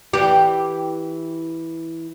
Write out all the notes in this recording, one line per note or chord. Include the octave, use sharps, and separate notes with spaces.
E3 G4